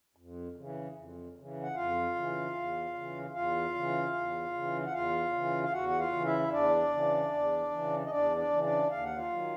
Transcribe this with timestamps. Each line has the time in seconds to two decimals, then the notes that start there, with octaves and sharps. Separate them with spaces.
0.16 F2
0.56 C#3 E3
0.96 F2
1.36 C#3 E3
1.62 F#5
1.75 F2 F4 F5
2.15 C#3 E3
2.55 E2
2.94 C#3 E3
3.34 E2 F4 F5
3.74 C#3 E3
4.14 E2
4.53 C#3 E3
4.86 F#5
4.93 E2 F4 F5
5.33 C#3 E3
5.64 F5
5.73 E2 F#4 F#5
5.89 F#5
5.99 F4 F5
6.13 C#3 E3
6.25 E4 E5
6.52 E2 D4 D5
6.91 C#3 E3
7.31 E2
7.71 C#3 E3
8.05 D#5
8.10 E2 D4 D5
8.37 D4 D5
8.51 C#3 E3
8.64 D4 D5
8.90 D#2 F5
9.04 F#5
9.17 F4 F5
9.29 D#3 F#3